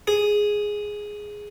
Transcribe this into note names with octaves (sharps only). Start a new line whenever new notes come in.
G#4